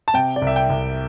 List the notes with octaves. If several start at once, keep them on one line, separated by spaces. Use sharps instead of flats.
A5
C3 G5
D5
C2
E5
G5
C2